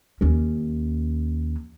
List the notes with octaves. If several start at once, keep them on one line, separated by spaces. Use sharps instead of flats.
D#2 C#4